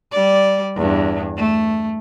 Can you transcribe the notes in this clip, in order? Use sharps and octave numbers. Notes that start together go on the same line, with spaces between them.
G3 D5
E2 G2
A3